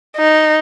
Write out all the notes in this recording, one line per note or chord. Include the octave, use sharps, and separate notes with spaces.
D#4